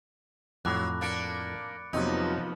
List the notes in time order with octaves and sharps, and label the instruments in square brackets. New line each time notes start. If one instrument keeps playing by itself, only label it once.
[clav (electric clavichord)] F2 A2 [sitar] F#3 [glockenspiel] B5 D6 F#6
[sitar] A#3 D4 [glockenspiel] A6 C#7 D7
[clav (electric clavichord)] F2 C3 F#3 [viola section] F3 A#3 B3 [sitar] D#4